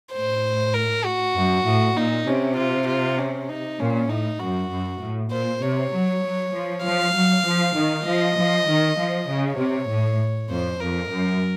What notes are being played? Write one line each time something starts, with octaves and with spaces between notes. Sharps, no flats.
A2 C5
A#4
F#4
F#2
A2
A#2 D#4
C3 C#4
F4
F4
C#4
D#4
A#2 C#4
A2 D#4
F#2 F#4
F#2
A2
A#2 C5
C3 C#5
F#3
F#3
F3
F3 F5
F#3
F3
D#3
F3 D#5
F3
D#3
F3
C#3 C#5
C3
A2
F2 C5
F2 A#4
F#2